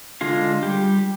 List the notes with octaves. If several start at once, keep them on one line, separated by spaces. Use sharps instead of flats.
D3 G#3 F4 F5
G3 G4